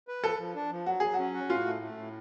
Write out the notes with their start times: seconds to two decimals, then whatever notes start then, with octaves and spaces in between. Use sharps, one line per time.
0.08 B4
0.23 F3 A4
0.38 F3
0.55 D4
0.70 F3
0.86 F#3 F#4
1.00 F#3 G#4
1.14 C#4 F#4
1.34 F#4
1.49 A2 F4
1.66 A3
1.82 A3
1.97 A2